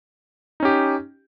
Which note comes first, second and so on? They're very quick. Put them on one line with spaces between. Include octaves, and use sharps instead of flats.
D#4 C#4 G4